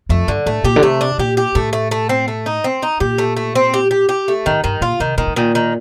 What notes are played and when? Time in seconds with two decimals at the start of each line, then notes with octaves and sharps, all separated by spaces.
0.09 F2 A3
0.28 G2 D3
0.46 A2 A3
0.64 A#2 G4
0.76 D3
0.83 C3 A3
1.01 D4
1.18 A#2 G4
1.37 G4
1.55 A2 A3
1.73 A3
1.91 A3
2.09 C4
2.28 A3
2.46 D#4
2.64 C4
2.83 D#4
3.00 A#2 G4
3.18 A3
3.37 A3
3.55 C4
3.74 G4
3.91 G4
4.09 G4
4.28 A3
4.46 A2 D#3
4.64 G2 D#3
4.81 A#2 F4
5.00 C3 D#3
5.18 A#2 D#3
5.27 A2
5.36 A#2 D#3
5.55 D#3